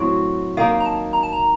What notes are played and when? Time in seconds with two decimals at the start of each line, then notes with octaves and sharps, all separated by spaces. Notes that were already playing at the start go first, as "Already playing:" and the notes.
Already playing: A2 F#3 C4 F#4
0.57 D#3 A#3 D#4 F5
0.80 A#5
0.85 A5
1.13 A#5
1.23 A5
1.33 A#5